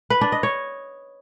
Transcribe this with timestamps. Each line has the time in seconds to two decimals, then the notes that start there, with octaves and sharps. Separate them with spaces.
0.10 B4
0.21 D4
0.32 D#5
0.43 C#5